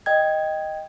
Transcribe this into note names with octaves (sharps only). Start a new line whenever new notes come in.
D#5 G5 G#6